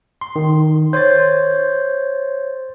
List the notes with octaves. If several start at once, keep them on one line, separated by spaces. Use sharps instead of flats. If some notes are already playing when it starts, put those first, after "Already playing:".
C6
D#3
C5 C#5 C6 G6 A6